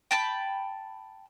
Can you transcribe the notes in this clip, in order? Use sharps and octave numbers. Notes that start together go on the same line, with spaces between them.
G5 A5 B5